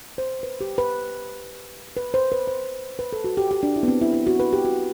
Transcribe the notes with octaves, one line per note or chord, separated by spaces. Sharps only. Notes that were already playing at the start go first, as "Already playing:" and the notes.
C5
B4
G4
B4
B4
C5
B4
C5
B4
A4
F#4
G4
G4
D4
E4
B3
C4
E4
E4
F#4
B4
G4
F#4